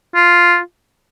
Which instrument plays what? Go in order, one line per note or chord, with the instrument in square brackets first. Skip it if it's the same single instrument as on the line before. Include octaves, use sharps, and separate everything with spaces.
[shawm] F4